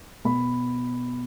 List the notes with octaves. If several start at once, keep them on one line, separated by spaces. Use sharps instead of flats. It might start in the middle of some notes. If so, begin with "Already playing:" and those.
B2 B5